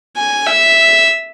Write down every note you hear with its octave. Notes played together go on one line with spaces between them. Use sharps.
G#5
E5